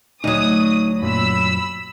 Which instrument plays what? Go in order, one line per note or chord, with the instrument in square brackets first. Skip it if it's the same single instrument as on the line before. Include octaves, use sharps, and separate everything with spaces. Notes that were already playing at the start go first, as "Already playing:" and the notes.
[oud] D2 F#3 [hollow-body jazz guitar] D#4 [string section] D#6
[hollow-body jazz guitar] F#2 A#2 [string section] B5 E6